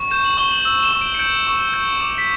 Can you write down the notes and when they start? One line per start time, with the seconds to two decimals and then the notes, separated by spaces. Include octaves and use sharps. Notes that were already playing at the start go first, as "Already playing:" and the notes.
Already playing: C#6
0.11 G6 E7
0.25 F#7
0.37 C#6 G7
0.51 F#7
0.65 E6 F#7
0.83 E7
0.92 C#6
1.01 D7
1.14 C#7
1.19 G6 D7
1.47 C#6
1.74 G6
2.01 D6
2.18 B6